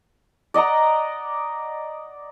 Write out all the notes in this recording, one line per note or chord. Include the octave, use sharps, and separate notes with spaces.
D5 D#5 F#5 A#5